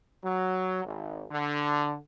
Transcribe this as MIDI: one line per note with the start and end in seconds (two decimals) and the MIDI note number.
0.24 0.84 54
0.85 1.24 32
1.31 1.96 50